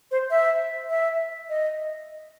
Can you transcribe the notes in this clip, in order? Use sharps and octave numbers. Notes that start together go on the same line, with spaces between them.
C5
E5
E5
D#5